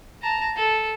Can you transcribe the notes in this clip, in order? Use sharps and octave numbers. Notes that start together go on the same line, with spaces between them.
A5 A#5
A4